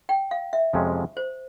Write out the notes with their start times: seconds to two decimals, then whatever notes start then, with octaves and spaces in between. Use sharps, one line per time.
0.09 G5
0.31 F5
0.53 E5
0.73 F2 C3 F3 G#3 C#4
1.17 C5